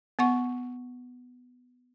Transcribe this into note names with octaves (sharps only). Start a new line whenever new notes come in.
B3 F#5 C#6